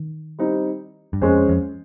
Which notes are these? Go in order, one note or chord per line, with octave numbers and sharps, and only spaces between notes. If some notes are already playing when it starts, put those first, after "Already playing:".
Already playing: D#3
G3 C4 D#4
G2
F2 G#3 C#4 G#4 C5
F2